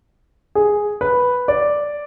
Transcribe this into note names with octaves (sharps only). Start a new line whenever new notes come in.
G#4
B4
D5